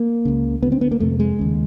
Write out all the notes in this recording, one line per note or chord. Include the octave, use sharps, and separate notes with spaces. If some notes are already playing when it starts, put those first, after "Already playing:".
Already playing: A#3
C#2 C#3
D2 D3 B3
C4
B3
A#3
F2 C3 A3
G#3
D#2 C#3